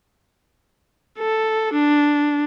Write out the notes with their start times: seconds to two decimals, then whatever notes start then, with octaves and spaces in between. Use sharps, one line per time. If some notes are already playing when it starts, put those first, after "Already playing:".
1.18 A4
1.73 D4